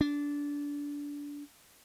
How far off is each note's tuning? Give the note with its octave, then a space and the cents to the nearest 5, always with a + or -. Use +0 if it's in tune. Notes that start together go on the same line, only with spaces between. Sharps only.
D4 -20